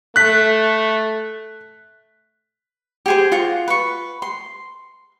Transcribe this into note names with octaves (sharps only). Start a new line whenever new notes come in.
A3 F#6 B6
G4 G#4 C5
F4 F#4 F#5
B4 C#6
C6